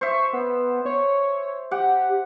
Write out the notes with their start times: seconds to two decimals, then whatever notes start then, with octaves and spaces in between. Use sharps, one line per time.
0.01 C5 E5 C#6
0.33 B3
0.85 C#5
1.71 G4 F#5